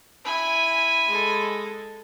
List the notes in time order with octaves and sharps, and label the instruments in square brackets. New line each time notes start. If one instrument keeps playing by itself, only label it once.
[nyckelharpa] E4 [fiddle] G#5 B5
[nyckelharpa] G#3 A4